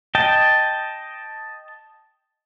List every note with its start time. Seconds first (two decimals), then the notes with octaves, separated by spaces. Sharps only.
0.15 D#5 G5 A5